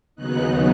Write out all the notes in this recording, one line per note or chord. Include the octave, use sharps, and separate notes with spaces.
D#2 C#3 F#3 B3 D#4 F#6